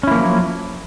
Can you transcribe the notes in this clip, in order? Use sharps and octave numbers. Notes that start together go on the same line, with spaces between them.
F3 F#3 A#3 C#4 E4